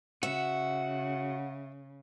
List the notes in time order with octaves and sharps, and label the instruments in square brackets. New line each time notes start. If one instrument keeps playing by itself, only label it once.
[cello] C#3 [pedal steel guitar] F#4 [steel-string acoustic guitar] E5 [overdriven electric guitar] F#5